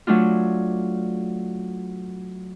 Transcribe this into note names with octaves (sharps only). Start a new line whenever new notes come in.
F#3 A3 D4 F4